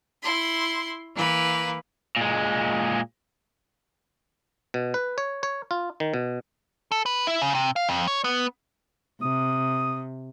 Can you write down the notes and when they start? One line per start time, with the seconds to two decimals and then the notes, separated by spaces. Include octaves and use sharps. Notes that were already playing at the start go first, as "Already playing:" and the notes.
0.23 E4 C6
1.15 E3 A#3 B4
2.16 A#2 G#3
4.74 B2
4.94 B4
5.18 C#5
5.43 C#5
5.71 F4
6.00 D#3
6.14 B2
6.92 A4
7.06 B4
7.27 E4
7.42 C#3
7.55 C3
7.76 F5
7.89 F2
8.07 C#5
8.24 B3
9.22 C3 D#6